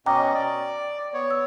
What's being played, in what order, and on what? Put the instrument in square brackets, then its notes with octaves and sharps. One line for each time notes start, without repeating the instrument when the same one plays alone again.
[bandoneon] B2 C#4 D#5 [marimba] G5 A#5 D6
[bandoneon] D5
B3 C#5
[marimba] E6